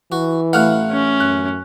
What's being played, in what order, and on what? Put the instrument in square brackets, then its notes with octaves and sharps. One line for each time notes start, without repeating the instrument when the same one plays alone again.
[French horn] E3 [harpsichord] F#4
[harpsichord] A1 A3 F5 [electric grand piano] F#5 F6 F#6
[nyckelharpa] C#4
[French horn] F#2 [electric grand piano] F#6